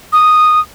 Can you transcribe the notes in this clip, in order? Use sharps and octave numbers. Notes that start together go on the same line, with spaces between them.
D#6